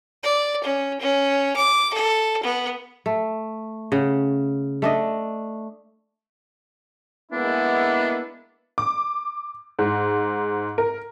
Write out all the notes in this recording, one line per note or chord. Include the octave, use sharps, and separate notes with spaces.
D5
C#4
C#4
D6
A4
B3
A3
C#3 F#5
A3 D4 D#5
G#3 A#3 B3 D4 E4
D6
G#2
A#4